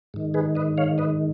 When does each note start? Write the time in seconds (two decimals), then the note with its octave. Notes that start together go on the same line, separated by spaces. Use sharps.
0.14 G#2 D#3
0.34 G#4 B4
0.55 B4 D#5
0.78 C#5 F5
0.98 B4 D#5